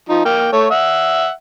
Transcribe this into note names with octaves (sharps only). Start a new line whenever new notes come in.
F3 D#4
A#3 G5 F6
A3 C#5
E5 F#5